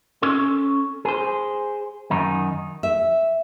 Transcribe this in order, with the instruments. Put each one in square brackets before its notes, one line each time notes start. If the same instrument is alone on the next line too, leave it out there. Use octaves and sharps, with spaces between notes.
[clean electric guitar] C#4 A4 C6
G#4 C5
F#2 D#3 D#4
[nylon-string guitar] E5